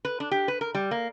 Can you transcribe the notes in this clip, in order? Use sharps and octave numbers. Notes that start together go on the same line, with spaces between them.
B4
D4
G4
B4
A#4
G3
A#3